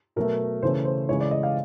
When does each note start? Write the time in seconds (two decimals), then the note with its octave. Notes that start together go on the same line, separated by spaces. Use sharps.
0.16 B2 F#3 A3 A#4
0.63 C#3 E3 A3 C#4 C5
0.85 C5
1.09 C#3 E3 G#3 C#4 E4 C#5
1.21 D5
1.31 D#5
1.43 F5